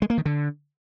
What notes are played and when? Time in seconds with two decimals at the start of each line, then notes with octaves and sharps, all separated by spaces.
0.02 G#3
0.10 A#3
0.18 D#3
0.25 D3